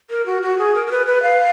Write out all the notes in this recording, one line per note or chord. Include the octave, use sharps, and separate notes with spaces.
A#4
F#4
F#4
G#4
A#4
A#4
B4
B4
F5